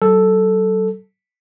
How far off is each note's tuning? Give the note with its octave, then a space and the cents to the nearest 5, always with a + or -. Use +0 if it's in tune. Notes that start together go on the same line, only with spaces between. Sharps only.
F#3 +40 A4 +0